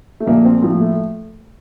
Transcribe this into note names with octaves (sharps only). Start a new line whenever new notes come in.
A3
A#1 A#3
C4
A2 F3 A#3
A3